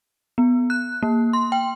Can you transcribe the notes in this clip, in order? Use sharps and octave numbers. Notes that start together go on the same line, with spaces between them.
B3
F#6
A#3
C6
G5